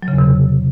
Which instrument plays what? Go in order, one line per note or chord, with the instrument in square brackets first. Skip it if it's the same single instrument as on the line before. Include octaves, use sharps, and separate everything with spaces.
[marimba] F#3
C#3
E2
C3